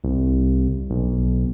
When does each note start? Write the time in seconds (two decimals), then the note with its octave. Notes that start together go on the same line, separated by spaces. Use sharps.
0.04 C2
0.90 B1